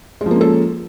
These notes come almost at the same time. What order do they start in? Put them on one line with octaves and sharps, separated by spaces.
G#3 F3 A#3 C#4 A4